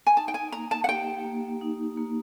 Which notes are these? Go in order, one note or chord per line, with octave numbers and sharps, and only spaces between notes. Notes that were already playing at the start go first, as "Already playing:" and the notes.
G#5
D#4 A5
G5
G#5
A#3 A#5
A5
F#5
G4 G5
A#3
D#4
A#3